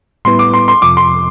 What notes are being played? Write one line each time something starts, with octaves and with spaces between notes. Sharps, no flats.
A2 G3 B3 E4 B4 C6
D6
C6
C6
F2 C3 F3 D6
C6